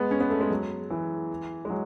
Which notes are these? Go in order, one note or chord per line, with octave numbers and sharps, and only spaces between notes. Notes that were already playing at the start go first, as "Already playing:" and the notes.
Already playing: G#3 B3
C#4
B3
A3
G#3
F#3
E3
G#3
F#3